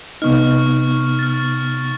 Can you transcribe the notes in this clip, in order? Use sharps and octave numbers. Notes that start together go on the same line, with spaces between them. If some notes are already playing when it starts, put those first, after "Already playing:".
C3 B3 D#4 C#6 F6
F6 A6